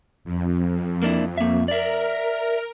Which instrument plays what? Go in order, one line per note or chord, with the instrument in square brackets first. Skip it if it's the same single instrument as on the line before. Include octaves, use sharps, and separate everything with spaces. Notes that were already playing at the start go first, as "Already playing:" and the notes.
[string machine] F2
[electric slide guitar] A#3 D4 E4
A#3 E5
[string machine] A#4 [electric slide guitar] D5 E5